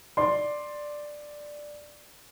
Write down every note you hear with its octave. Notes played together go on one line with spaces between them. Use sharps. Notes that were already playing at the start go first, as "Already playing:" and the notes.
D5 C6